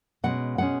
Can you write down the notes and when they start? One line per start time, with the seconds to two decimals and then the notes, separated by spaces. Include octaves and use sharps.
0.24 B2 G#3 C#4 F#5
0.58 B2 G#3 C#4 F#5